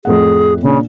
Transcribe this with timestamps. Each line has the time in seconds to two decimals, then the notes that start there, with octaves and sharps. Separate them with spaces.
0.05 F2 A2 G#4 F#5
0.63 A#2 C#3 D4